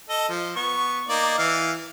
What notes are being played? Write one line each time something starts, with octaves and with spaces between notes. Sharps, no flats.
A4 D#5
F3
B3 C#6
A#3 D#4 D5
E3 F5